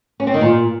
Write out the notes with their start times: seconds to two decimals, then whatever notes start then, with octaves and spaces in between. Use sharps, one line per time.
0.20 C#4
0.27 C4
0.34 D#3
0.41 A#2